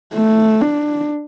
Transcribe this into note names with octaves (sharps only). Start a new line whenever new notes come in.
A3
D4